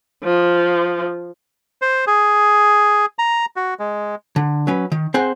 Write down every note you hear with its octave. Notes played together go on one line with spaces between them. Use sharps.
F3
C5
G#4
A#5
F#4
G#3
D3
F#3 C#4 B4
D#3
C4 G#4 C5 F#5 G#5